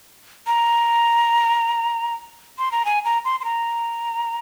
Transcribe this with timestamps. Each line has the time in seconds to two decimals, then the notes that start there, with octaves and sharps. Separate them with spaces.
0.47 A#5
2.58 C6
2.72 A#5
2.85 G#5
3.05 A#5
3.25 C6
3.40 C6
3.45 A#5